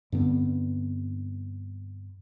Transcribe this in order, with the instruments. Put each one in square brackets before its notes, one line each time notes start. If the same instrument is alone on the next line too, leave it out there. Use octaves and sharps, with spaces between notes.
[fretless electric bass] G2 D3 B3 C4